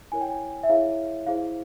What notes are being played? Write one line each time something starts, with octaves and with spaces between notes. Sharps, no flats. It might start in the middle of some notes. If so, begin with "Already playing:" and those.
E4 A#4 C#5 G#5
G5
G#5
E5
E4 G#4 C#5 F5
E4 G#4 C5 F5